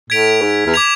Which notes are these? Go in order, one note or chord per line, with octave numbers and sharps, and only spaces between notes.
A2 G#6 B6 D7 F7
G#2
E2
D6 G#6 B6 F7